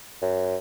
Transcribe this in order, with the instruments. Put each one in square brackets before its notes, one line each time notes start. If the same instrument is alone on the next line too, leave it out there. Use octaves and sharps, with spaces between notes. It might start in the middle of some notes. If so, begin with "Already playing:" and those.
[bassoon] F#2